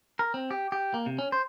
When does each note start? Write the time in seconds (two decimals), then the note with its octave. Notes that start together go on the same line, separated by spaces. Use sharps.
0.19 A#4
0.34 C4
0.51 G4
0.72 G4
0.94 A#3
1.06 C3
1.18 C#4
1.32 C5